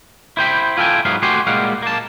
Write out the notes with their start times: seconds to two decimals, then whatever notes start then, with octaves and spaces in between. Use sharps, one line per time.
0.37 E4 C5 G5 B5
0.77 E4 F4 A4 E5 G5 G#5
1.05 G#2 F#3 B3 F5
1.23 A3 F#4 G4 G#5 C6
1.47 A#2 G3 G#3 F5 F#5
1.82 A#3 A5